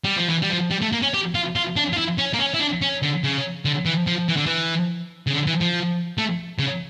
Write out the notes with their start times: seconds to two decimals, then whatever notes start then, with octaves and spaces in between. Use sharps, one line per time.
0.04 G3
0.16 F3
0.30 E3
0.42 G3
0.50 F3
0.71 G3
0.82 A3
0.93 A#3
1.02 C#4
1.14 G4
1.35 F4
1.56 F4
1.76 D4
1.93 F4
1.98 E4
2.18 C#4
2.33 A#3
2.39 C#4
2.54 E4
2.60 D4
2.82 C#4
3.02 D3
3.24 C#3
3.65 D3
3.86 E3
4.07 F3
4.29 E3
4.37 D3
4.46 E3
5.27 C#3
5.34 D3
5.47 E3
5.61 F3
6.18 A3
6.59 C#3